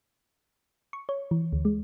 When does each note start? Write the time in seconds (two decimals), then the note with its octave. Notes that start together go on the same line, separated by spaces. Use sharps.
0.93 C#6
1.09 C#5
1.31 E3
1.53 D2
1.65 G#3